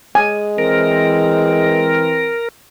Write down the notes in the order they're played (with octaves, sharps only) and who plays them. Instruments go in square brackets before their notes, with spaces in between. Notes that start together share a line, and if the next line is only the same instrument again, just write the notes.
[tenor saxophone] G#3 [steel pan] G#5
[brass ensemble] E3 C4 [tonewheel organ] A#4